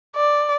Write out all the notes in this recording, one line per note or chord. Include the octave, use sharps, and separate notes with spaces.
D5